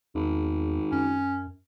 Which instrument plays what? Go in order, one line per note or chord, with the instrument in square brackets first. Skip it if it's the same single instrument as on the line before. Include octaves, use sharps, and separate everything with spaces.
[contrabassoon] G#1 [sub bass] E2
[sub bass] F#2 [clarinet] C#4